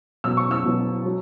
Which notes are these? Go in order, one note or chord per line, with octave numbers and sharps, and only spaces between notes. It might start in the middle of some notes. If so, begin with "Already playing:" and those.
B2 F#3 E6
C#6
E6
B2 F#3
F#3